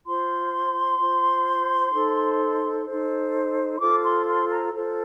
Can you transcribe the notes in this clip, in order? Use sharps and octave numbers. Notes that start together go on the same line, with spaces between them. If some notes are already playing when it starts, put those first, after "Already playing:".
F4 C5 C6
F4 C5
D#4 A4 C5
D#4 A4 C5
C6
F4 A4 C5 D6
C6
C6
A#5
F4 A4 C5